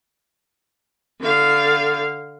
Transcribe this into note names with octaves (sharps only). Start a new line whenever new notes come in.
D3 F5